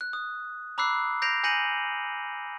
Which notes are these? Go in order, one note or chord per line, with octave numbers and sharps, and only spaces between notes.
F#6
D#6
A#5 B5 D6 E6 F#6 C7
G6 A#6 C7 D7 F7
G#5 G6 A#6 C#7 D#7 F#7